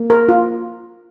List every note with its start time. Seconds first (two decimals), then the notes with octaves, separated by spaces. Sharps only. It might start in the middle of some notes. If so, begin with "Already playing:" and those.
Already playing: A#3
0.10 A#4
0.29 F4